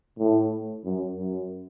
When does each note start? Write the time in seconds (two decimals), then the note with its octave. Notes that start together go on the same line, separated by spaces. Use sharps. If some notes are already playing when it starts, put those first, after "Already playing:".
0.18 A2
0.84 F#2
1.17 F#2